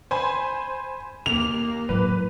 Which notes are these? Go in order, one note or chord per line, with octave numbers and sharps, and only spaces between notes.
C5 G#5 B5
D#2 A#3 F7
A2 F#3 B4